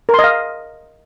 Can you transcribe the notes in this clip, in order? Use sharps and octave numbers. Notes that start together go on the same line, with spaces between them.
A#4
C6
D#5
F5